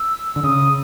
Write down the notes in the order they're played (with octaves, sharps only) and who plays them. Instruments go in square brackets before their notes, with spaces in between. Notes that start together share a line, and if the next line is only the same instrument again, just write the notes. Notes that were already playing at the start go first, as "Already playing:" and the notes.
Already playing: [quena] E6
[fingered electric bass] D3
[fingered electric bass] C#3 [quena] D#6